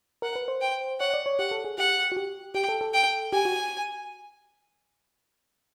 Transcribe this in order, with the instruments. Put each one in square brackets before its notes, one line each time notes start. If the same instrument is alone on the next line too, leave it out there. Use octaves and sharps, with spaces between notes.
[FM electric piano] A#4 [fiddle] F#5
[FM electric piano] B4
C5
[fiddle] G5
[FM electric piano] C#5 [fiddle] F#5
[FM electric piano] D5
C#5
[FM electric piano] G4 [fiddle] F#5
[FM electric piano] A4
G#4
[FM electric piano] G4 [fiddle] F#5
[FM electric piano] F#4
G4
[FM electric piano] G4 [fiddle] G5
[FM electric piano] A4
A4
[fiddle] G5
[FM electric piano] G4 [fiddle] G#5
[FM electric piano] F#4